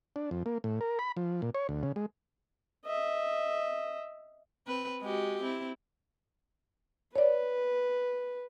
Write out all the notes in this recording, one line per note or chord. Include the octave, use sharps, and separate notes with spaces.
D4
F2
A#3
A2
A#4
B5
F3
A#2
C#5
D2
C#3
G#3
D#5 E5
C4 B4
G#3 F#4 G4
C4 E4
B4 C#5 D5